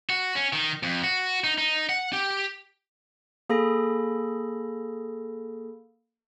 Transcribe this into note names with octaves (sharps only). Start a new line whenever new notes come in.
F#4
C#4
D#3
F2
F#4
D#4
D#4
F#5
G4
A#3 G#4 A4 B5 A#6